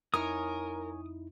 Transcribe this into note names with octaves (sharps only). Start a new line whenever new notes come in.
F2 D#4 E4 A#4 C#5 G#5 D#6